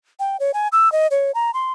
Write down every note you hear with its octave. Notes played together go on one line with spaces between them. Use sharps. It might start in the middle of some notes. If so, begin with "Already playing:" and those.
G5
C#5
G#5
E6
D#5
C#5
A#5
C6